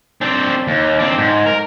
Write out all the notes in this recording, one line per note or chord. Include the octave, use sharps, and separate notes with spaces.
C4 D4
D#2
C4 D4
G#2
A#4